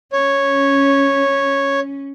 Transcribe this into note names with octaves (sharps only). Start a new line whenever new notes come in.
C#4 C#5